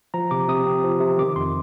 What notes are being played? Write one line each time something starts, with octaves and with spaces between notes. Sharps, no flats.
F3 A#5
C3 D6
C3 D#6
C4
F3
C3
D#3 D6
F2 C6